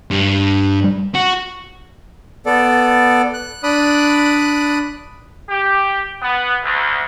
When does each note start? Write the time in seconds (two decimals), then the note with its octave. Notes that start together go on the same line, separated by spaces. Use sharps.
0.11 G2
1.15 F#4
2.46 B3 A4 D5
3.33 F#6
3.63 D4 D5 B5 D#6 F#6
5.49 G4
6.22 B3
6.63 D2